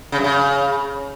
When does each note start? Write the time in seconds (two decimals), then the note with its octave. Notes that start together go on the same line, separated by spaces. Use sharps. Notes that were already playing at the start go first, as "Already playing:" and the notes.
0.12 C#3
0.18 F#2
0.24 C#3